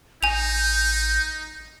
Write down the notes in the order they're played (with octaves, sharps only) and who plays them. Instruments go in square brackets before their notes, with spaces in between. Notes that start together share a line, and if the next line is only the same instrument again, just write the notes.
[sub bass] A1 [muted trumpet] D#4 [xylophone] G#5 F7 [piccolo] G6